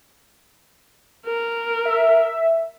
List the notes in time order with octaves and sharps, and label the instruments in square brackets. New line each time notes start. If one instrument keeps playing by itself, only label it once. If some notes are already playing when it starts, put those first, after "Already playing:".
[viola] A#4
[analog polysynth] E5